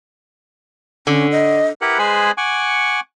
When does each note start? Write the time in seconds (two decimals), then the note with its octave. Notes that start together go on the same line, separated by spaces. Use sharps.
1.07 D3 C#4
1.32 D#5
1.81 E4 G4 A#4 B4 F#5
1.99 G#3 G#4 B4 C5 G#5 B5
2.38 F#5 G#5 C#6 D6